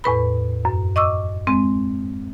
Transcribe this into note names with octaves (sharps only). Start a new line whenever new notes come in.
E2 A2 B4 B5
F#2
D#5 C#6 D6 E6
G#3 C4